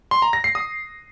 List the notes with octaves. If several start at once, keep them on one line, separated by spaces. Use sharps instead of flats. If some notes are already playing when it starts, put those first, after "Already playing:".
C6
A#5
A#6
C7
D#6